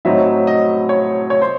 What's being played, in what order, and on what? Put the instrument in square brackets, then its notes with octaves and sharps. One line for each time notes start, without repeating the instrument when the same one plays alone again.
[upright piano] A2 F#3 C4 D#4 [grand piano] E5
[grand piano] D#5
C#5
C#5
C5